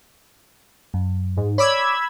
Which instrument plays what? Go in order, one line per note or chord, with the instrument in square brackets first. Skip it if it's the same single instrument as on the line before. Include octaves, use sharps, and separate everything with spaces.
[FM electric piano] F#2
[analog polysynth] G#2
[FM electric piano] C#5 D5 D6 [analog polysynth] B5 E6 G#6